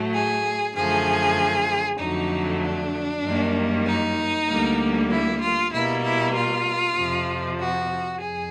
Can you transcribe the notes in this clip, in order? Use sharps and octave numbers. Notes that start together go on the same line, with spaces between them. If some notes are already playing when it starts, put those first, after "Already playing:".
Already playing: A2 F#3 A3
G#4
F#2 D3 F3 A3 G#4
F2 D3 F#3 A3 D#4
D4
F#2 D#3 G3 A#3
D#4
D2 D3 G3 A#3
E4
F4
B2 G3 A#3 E4
E4
F4
F2 C3 F3
F#4
F2 G#4